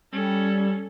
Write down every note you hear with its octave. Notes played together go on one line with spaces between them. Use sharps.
G3 C#4 A4